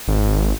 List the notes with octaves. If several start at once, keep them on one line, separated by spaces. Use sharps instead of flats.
G#1